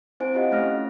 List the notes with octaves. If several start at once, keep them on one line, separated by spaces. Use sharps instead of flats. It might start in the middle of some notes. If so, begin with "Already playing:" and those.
C4 E4 C5 G#5 F#6 D7
F4 G4 D#5 F5 F#5
A3 C#4 C#5 F6 A#6